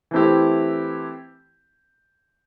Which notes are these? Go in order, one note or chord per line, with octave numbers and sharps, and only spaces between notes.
E3 A3 C4 E4 G4